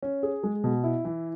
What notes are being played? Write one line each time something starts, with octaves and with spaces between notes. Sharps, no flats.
C#4
G#4
G#3
B2
E4
E3